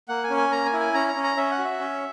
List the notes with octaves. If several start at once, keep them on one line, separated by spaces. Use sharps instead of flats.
A#3 F#5
G#5
C#4
G#5
A#3 A#5
G#5
E4
G#5
C#4 A#5
A#5
C#4
A#5
C#4 E5
F#5
F#4
E5
C#4